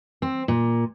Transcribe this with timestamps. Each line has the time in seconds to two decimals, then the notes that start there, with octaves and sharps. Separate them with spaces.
0.22 C4
0.48 A#2